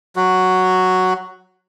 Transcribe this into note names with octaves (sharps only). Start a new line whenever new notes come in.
F#3 F#4